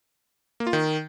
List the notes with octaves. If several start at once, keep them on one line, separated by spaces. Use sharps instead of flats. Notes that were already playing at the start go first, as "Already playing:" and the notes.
A#3
F4
D#3